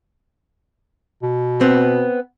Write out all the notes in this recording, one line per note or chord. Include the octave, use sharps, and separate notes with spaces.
B2
B3 C4